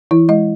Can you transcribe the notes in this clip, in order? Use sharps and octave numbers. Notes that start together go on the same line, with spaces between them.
E3 E4
G#3 D#5